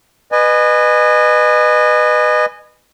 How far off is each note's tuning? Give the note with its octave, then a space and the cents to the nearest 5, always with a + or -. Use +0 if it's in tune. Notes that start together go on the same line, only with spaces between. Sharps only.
B4 +0 D#5 -30 G#5 +0